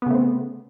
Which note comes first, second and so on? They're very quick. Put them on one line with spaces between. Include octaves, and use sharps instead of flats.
B3 C#3 A3 C4